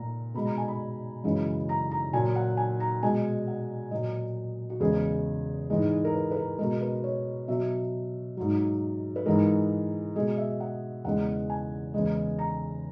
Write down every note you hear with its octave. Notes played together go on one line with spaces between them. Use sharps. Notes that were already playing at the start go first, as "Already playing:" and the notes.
Already playing: A#2 A#5
B2 G#3 B5
A#5
G#5
B5
F#2 C#3 E3 G#3
A#5
A#5
A#2 F#3 G#5
F#5
G#5
A#5
B2 G#3 G#5
F#5
A#2 F#3 D#5
F#4
E2 C#3 G#3 G#4
G#2 E3 G#3
A#4
B4
B4
A#4
B2 G#3 A#4
B4
C#5
B2 F#3 E5
G#2 F#3
B4
G#2 E3 G#3 A#4
B2 G#3 G#4
E5
F#5
E2 C#3 E3 G#3 F#5
G#5
E2 C#3 G#3
A#5